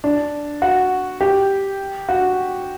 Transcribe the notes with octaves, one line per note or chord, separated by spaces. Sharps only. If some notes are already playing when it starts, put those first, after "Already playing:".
D4
F#4
G4
F#4